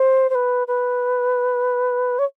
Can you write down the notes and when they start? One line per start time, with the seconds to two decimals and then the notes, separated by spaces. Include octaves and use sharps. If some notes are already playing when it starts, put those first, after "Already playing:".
Already playing: C5
0.30 C5
0.35 B4
0.68 B4
2.19 C#5